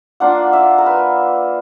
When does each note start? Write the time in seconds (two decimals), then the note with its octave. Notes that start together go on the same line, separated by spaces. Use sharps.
0.20 A#3 D4 F4 F#5
0.53 E5
0.78 A#4
0.86 B4